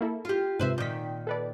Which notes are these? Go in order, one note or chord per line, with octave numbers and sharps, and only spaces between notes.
A#3 E4 A4
F4 G4
G#2 C3 B4 C5 E5
A#2 D#3 G6 B6
A4 B4 D5